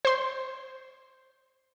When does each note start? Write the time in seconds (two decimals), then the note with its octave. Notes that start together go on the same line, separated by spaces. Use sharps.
0.05 C5 C6